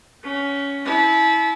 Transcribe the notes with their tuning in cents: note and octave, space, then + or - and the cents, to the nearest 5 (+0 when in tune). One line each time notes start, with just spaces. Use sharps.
C#4 +15 F#5 +40
E4 -15 A5 -40